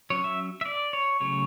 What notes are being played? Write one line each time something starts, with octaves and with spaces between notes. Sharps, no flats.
F#3 C#4 C#5
E5
E5
D5
C#5
C#3 F#3 A3 C#5